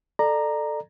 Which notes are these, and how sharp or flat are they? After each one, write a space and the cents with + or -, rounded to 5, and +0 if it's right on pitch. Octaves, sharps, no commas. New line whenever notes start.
A4 +0 D5 +30 A#5 +0